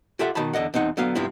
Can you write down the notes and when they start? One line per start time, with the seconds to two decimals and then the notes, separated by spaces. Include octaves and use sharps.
0.19 F4 G4 A4 E5 F#5
0.35 B2 D#3 D#4 A5 B5
0.53 E2 D3 D#5 F#5
0.74 E2 C4 D#4 F#5
0.97 D3 F#3 B3 F5
1.15 G2 C3 F3 B3 C4 E4